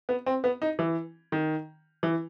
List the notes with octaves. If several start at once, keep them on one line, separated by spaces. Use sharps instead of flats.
B3
C4
B3
D#4
E3
D#3
E3